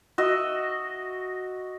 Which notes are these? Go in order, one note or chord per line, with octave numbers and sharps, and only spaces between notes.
F#4 D#5 E5